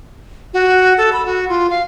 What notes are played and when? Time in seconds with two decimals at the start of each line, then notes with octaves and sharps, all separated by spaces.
0.54 F#4
0.98 A4
1.13 B5
1.26 F#4
1.49 F4
1.70 F5